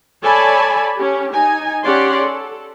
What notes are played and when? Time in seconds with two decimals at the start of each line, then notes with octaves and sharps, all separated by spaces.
0.23 A4 C#5 D5 G#5 A5 B5
0.96 C#4 G4
1.32 D#4 G#5
1.84 C#4 G4 D5 F#5 C6
2.26 A4